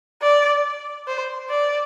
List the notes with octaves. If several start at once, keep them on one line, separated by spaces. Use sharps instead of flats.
D5
C5
D5